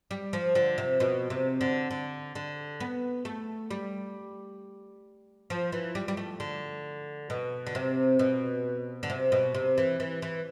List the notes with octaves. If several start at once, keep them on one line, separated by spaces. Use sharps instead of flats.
G3
F3
D3
C3
B2
C3
D3
D3
D3
B3
A3
G3
F3
E3
G3
G3
A3
D3
B2
D3
C3
B2
D3
C3
B2
C3
E3
E3
E3